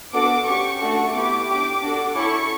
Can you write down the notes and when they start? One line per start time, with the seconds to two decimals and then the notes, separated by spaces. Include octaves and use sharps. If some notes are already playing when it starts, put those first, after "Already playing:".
0.13 B3 D4 F#4 A4 D6
0.47 C#4 G4 C#6
0.80 A3 D4 F#4 A4 C#6
1.14 B3 E4 G4 D6
1.48 D4 G4
1.81 D4 F#4 A4
2.15 C#4 E4 A4 C#6